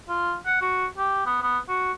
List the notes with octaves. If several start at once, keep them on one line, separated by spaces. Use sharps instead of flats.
F4
F#5
F#4
G4
B3
B3
F#4